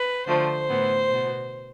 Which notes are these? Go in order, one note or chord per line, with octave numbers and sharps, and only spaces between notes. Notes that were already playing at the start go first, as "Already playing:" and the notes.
Already playing: B4
D3 F3 A3 C5
A2 E3 B3
B2 B3